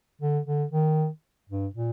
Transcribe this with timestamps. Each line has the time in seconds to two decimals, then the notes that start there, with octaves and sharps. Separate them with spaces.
0.21 D3
0.46 D3
0.71 D#3
1.49 G2
1.74 A#2